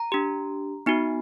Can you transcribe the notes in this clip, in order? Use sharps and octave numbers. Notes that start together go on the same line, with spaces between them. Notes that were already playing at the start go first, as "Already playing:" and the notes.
Already playing: A#5
D4 G4
B3 D#4 F#4